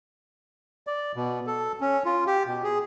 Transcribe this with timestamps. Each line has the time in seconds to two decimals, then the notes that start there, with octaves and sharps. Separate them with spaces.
0.87 D5
1.16 B2
1.47 A4
1.81 C#4
2.05 F4
2.27 G4
2.47 B2
2.64 G#4